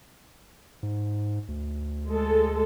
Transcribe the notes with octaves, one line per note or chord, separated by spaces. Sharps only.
G#2
D2
G#3 A4